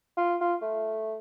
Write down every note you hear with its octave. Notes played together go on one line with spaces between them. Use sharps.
F4
F4
A3